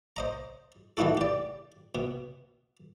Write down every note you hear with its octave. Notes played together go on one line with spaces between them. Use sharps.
C5 D#5 A#5
E3 A3 D#4 E4 F#4 A4
G4 D5
B2